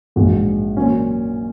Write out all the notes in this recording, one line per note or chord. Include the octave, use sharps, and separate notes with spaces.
A#1 G#2 G#3 F#4
A#2 F#3 C#4